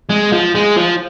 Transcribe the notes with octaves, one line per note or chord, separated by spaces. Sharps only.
G#3
F3
G#3
F3